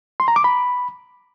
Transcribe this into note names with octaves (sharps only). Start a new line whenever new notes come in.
C6
A#5
D6
B5